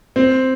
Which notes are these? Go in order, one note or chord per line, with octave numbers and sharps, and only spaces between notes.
C4